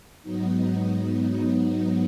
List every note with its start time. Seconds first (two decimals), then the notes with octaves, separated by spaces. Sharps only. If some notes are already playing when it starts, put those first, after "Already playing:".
0.23 G#2 F#3 B3 D#4
0.83 D#4